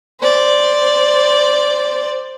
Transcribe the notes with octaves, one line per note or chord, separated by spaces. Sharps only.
C5 D5